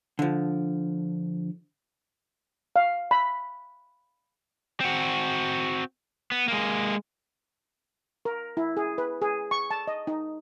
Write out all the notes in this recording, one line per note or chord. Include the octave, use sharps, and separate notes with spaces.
D3 F3
F5
B5
C4 F#4
B3
G#3 A#3
A#4
E4
G#4
B4
G#4
C#6
A5
D#5
D#4